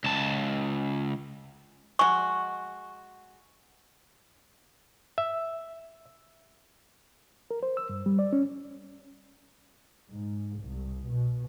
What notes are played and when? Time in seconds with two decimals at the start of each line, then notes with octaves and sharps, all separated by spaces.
0.04 C#2 A5
1.99 G#3 F#4 C#6
5.18 E5
7.51 A#4
7.63 C5
7.77 E6
7.89 G2
8.06 G3
8.19 D5
8.33 C#4
10.11 G#2
10.61 C2
11.08 B2